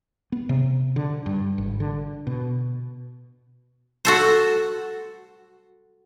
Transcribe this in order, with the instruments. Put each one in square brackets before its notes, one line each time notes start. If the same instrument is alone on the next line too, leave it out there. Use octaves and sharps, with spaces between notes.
[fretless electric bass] B3
C3
D3
G2
G#1
D3
B2
[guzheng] F#4 A4 C5